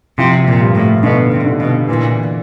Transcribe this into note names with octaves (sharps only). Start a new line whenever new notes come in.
C3 F3
A#2
G2
A2
B2 D3
C3
D3
B2
A#2 E3